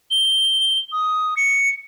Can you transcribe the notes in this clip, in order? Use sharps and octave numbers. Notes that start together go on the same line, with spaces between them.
G7
D#6
C#7